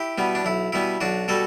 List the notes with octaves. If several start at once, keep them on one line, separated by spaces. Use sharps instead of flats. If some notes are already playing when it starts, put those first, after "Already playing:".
Already playing: E4 G4
B2 G3 B3
D4
B1 E4
B2 G3 B3 E4
B1 D4 F#4
B2 G3 F#4 A4